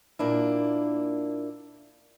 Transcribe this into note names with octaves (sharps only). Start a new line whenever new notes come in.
A#2 A#3 D4 E4